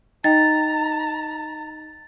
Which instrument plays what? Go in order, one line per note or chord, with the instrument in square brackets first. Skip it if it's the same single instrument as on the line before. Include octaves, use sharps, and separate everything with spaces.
[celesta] D#4 D#5 G5 [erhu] A#5 [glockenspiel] A6